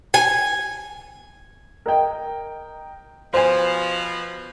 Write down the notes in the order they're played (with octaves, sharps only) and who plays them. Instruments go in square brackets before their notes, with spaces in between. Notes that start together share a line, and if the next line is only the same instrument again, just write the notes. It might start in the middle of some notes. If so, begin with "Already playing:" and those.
[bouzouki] G#5
[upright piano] A#4 D#5 G5
[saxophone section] B2 F3 [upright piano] C5 G#5